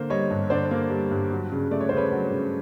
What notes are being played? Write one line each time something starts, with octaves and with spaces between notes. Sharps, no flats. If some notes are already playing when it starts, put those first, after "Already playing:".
Already playing: D3 A#3 C5
G3 C#5 D#5
G2
D3 C5 D5
A#3
G3
G2
F#3
C#3
A3 D5
C#5
C#3 C5
B4 C#5
F#3
C#3